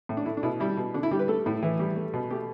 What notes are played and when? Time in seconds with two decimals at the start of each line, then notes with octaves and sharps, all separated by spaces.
0.09 A2
0.17 D4
0.26 A3 E4
0.37 D4
0.43 B2 E4
0.60 G3 E4
0.77 B2
0.94 D3 D4
1.03 E4
1.11 G3 G4
1.19 B4
1.28 A3 A4
1.46 A2 E4
1.63 E3
1.79 G3
1.96 A3
2.14 B2
2.31 A3 G4